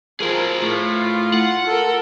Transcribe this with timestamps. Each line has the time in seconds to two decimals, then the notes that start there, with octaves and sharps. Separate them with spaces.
0.20 F3 G#4 A#4
0.62 A2 F4
1.34 F#5
1.67 A4 A#4